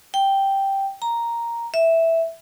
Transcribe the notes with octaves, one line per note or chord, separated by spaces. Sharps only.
G5
A#5
E5